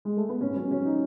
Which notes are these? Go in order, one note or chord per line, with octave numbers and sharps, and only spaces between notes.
G#3
A3
B3
G#2 C#4
F#3 C#4
F#3 C#4
D#4